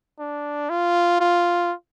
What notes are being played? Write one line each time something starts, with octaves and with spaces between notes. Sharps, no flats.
D4
F4
F4